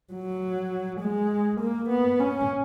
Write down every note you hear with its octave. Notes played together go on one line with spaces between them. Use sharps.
F#3
G#3
A#3
B3
C#4